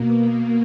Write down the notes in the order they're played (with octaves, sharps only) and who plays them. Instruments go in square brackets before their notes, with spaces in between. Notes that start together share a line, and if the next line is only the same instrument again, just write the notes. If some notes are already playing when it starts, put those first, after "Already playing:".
Already playing: [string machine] B2 A#3